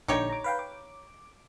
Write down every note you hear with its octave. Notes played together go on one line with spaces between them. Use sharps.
A#1 D3 D#4 G4 C#5
A#5 D6
B4 F5 G5
D6